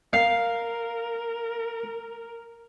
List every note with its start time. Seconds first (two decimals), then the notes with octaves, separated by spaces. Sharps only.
0.13 A#4 F5